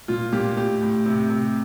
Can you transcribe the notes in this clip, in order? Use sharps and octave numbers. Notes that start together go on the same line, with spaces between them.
A#2 F4
A#2 G4
A2 G4
A2
C3
C3